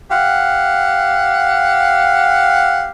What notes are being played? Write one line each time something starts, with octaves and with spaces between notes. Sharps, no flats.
G4 F5 F#5